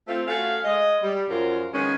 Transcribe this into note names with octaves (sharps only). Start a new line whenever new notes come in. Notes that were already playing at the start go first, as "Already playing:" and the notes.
A3 C4 F4
A3 C#4 F#4 F5
G#3 D#5
G3
F#2 A#2 F3 F#3 F4 A#4
D#3 F3 G#3 B3 C#4